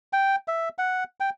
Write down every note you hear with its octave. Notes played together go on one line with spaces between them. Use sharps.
G5
E5
F#5
G5